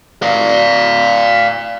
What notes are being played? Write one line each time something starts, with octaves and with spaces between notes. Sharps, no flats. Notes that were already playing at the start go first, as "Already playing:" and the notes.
D5 F5